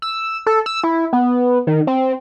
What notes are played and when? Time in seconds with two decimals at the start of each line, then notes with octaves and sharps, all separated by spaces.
0.02 E6
0.47 A4
0.66 E6
0.84 E4
1.13 B3
1.67 D#3
1.87 C4